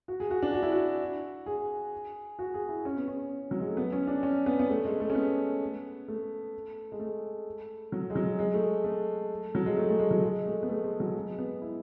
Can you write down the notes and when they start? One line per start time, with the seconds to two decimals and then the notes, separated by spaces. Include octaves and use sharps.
0.08 F#4
0.20 G#4
0.31 F#4
0.42 D4
0.54 F#4
0.63 E4
0.72 F#4
1.46 G#4
2.39 F#4
2.54 G#4
2.69 E4
2.85 C#4
2.97 B3
3.08 C#4
3.51 F#3
3.60 G#3
3.68 A3
3.77 B3
3.92 C#4
4.07 D4
4.23 C#4
4.46 B3
4.59 B3
4.70 A3
4.85 G#3
5.00 A3
5.10 C#4
5.15 B3
6.08 A3
6.92 G#3
7.00 A3
7.92 F#3
8.10 G#3
8.16 F#3
8.39 G#3
8.54 A3
8.84 A3
9.55 F#3
9.66 G#3
9.77 A3
9.89 A3
10.00 G#3
10.11 F#3
10.23 G#3
10.46 A3
10.63 B3
10.69 A3
10.84 G#3
11.00 F#3
11.15 G#3
11.38 B3
11.62 E4